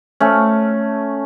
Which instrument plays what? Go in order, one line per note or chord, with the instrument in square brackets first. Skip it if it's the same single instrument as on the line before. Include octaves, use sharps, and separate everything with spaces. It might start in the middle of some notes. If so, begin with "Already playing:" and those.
[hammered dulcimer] A3 C#4